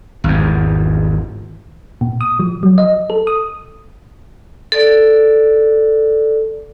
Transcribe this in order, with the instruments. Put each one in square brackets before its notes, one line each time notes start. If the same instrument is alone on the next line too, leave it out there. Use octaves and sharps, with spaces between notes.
[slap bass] G#1 E2
[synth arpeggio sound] A#2
D#6
F3
F#3
D#5
A4
D#6
[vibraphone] A4 D5